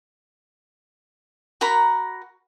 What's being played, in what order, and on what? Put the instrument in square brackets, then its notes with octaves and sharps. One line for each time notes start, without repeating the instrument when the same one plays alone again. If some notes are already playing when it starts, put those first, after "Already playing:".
[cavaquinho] F#4 A#4 A#5 B5